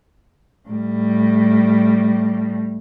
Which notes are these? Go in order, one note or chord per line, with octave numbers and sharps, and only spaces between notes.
A2 G3